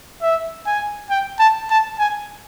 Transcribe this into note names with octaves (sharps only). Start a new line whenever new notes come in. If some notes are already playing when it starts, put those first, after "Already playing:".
E5
G#5
G5
A5
A5
G#5